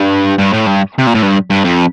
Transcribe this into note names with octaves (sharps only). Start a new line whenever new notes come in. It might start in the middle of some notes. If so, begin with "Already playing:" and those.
Already playing: G2
G2
A2
G2
C3
A#2
A2
G2
G2
F2